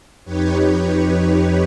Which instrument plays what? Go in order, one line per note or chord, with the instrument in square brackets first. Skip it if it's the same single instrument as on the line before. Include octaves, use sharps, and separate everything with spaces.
[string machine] F2 D#4 G4 B4 C#5